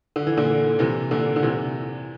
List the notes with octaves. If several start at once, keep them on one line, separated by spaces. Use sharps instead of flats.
D3
E3
A#2 D3
C3 E3
A#2 D3
D3
C3 E3